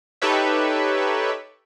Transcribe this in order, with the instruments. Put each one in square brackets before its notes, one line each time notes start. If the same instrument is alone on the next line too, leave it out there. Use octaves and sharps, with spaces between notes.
[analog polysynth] D#4 G4 A4 B4 C#5 E5